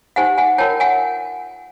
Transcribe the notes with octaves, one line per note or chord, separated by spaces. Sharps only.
D#4 G4 C5 F#5 G#5
F#5 G#5
F4 A#4 C#5 G5 A5
F#5 G#5